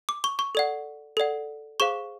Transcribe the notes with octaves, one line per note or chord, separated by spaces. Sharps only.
D6
C#6
C#6
A4 D5 F#5
A4 D5 F#5
G#4 C5 F5 C#6